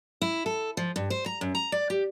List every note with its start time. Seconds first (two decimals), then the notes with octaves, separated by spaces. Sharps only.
0.22 E4
0.46 A4
0.77 F3
0.96 G2
1.10 C5
1.26 A#5
1.41 F#2
1.55 A#5
1.72 D5
1.90 G4